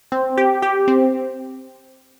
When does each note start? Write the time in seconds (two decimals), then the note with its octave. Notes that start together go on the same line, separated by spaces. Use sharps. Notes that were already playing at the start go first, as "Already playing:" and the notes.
0.12 C4
0.37 G4
0.62 G4
0.88 C4